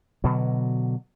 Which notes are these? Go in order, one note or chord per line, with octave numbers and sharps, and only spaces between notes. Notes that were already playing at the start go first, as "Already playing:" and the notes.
B2 D3 F#3